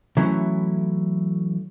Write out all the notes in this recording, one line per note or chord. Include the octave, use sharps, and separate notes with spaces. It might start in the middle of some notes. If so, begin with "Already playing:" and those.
E3 F#3 A3 C#4 E4